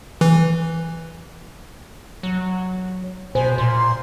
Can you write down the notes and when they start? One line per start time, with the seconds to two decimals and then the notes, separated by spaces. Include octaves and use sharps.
0.21 E3
2.23 F#3
3.35 B2 C5 G#5
3.58 A#2 C6